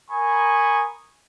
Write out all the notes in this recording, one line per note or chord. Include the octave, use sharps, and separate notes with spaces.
A#4 G#5 A#5 B5 C#6 D#6